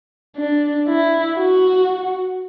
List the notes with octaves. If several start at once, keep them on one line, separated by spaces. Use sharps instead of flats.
D4
E4
F#4